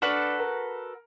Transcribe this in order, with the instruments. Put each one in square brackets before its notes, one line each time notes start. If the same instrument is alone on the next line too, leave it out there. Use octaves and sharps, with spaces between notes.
[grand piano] D4 F6 [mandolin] F#4 A4 B4
[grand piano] A#4